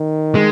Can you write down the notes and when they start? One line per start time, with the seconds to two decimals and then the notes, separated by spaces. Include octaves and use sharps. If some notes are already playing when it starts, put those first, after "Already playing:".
Already playing: D#3
0.35 G#3